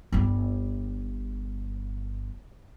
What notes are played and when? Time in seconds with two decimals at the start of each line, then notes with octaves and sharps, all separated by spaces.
0.12 G1 G3